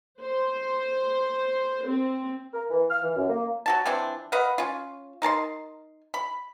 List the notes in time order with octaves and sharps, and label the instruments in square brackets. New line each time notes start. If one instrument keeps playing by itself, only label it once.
[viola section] C5
C4
[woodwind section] A#4
E3
F6
E3
F#2
A#3
[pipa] F#3 F#4 A5
E3 F3 C4 D4
B4 D#5 F5 F#5
C#4 F4
D#4 A#4 A5 C6
B5